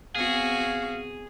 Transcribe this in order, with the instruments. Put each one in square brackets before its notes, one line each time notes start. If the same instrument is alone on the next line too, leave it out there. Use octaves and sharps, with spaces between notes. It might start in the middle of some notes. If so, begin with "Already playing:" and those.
[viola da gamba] B3 C4 F#4 [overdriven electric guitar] G#4 [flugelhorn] F5